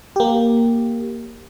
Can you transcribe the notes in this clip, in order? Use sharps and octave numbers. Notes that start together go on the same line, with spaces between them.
A#3 G4